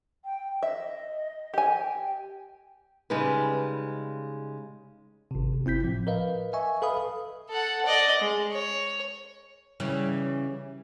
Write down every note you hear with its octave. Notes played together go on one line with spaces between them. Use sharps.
G5
D#5 E5
G4 G#5
G5
C#3 G3 G#3 D#4 B4
G#1 C3
G1 C4 E4 G6 B6
A2 F3
A#4 B4 D#5 F5
D#5 E5 G#5 C#6
A4 B4 F5 B5 D#6
A4 F#5
D5 D#5
G#3
C#5
C#3 E3 G3